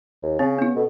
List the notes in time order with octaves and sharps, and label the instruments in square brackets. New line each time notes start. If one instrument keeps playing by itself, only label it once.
[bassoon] D#2
[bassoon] C#3 [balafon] C4
[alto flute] B3 [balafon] C#4 E4
[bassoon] B2 [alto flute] A4